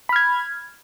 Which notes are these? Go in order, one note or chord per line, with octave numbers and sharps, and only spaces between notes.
B5 F6 G#6